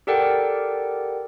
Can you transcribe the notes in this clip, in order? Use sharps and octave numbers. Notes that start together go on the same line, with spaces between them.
G4 A4 A#4 D5 F#5 G5